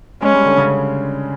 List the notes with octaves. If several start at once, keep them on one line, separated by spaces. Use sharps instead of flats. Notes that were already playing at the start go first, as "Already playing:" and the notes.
G#3 C#4
G3
D3
C#3